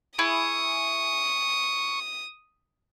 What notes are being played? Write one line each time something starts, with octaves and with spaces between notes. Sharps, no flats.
E4 G#4 C#6 D#6